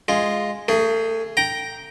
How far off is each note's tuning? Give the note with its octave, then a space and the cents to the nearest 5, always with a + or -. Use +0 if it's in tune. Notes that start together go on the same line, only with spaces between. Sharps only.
G#3 +0 F4 +0
A3 +35 G#4 +0
G5 -5 A#5 +10